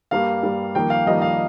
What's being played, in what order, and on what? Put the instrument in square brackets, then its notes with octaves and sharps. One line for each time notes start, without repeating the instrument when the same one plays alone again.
[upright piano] G2 G3 A#3 F5
G2 G3 A#3
F2 D#3 G3 A#3 G5
F5
F2 D#3 G3 A#3 D#5
F5